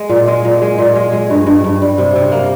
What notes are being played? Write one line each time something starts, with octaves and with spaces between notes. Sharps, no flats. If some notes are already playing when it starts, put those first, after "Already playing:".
Already playing: G#3
A#2
G#3
A#2
G#3
A#2
G#3
G#3
G2
G2
G2
G3
C3
C3
A#3